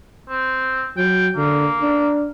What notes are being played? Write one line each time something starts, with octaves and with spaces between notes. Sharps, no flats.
C4
F#3 G5
D3 A#3
D4